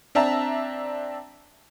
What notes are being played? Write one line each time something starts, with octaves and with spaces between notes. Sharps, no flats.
C4 D4 E5 A5 A#5